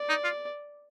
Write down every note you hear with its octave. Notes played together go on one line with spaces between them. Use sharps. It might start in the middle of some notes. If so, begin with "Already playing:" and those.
Already playing: D5
D#4
F4